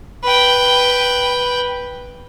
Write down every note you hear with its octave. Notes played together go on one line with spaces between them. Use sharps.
B4 G5